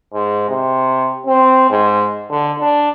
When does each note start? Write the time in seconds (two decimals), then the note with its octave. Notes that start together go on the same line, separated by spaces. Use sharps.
0.14 G#2
0.49 C3
1.26 C4
1.70 G#2
2.30 D3
2.60 D4